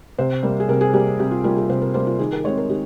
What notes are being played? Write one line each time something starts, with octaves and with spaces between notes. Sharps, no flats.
C3 C5
G3 A#3
G#4
C3 A#4
G#4
G3 A#3 G4
C3 G4
F4
G3 A#3 F4
G#4
C3 C5
A#4
G3 A#3 C5
F4
D#3 G#4
A#4
G#3 C4 C#5
A#4
D#3 G4